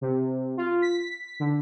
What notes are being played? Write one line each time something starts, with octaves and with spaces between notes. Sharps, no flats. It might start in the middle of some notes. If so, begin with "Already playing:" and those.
C3
F4
B6
D3